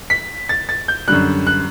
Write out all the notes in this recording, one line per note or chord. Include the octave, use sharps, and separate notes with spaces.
B6
A6
A6
G6
F#2 D3 G3 F#6
F#6